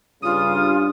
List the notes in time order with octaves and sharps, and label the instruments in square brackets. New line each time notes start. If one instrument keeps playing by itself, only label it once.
[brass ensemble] G2 [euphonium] C#3 [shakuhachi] F4 [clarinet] D#6